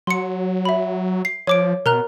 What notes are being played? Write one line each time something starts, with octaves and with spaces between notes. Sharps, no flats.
F#3 C6 C#7
E5 B5
C7
F3 C#5 D6 D7
B2 A#4 A#5 F#6